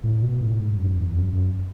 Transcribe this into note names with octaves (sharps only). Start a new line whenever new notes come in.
A2
B2
A2
G#2
F#2
E2
F#2
F#2